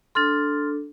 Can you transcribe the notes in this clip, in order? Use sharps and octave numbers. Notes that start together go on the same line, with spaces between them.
D4 A4 C6 F6 A6